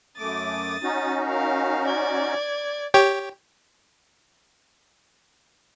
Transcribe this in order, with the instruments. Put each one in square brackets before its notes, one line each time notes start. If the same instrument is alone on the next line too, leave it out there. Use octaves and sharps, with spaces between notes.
[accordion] F#2 A3 D6 [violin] D#6 A6
[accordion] C#4 D#4 F#4
[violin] A#4 F5
D5 G#6
[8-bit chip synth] G4 C#5 G5